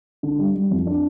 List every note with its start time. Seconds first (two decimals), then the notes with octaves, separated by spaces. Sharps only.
0.23 D3
0.39 G3
0.55 G3
0.71 F2
0.87 D4